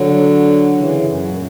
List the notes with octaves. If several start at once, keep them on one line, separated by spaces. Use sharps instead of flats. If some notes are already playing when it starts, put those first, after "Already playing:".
Already playing: D3 F#3
C#3 E3
G2
F#2
A#2